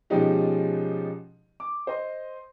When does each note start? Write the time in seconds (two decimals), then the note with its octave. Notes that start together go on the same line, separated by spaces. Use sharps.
0.10 B2 F3 G#3 C#4 D#4 G4
1.60 D6
1.87 C5 D#5 C6